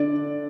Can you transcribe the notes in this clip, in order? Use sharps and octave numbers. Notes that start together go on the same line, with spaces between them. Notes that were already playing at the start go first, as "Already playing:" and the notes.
Already playing: D3 D5